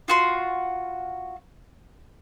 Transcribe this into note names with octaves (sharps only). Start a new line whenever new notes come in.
F4 F#4 C6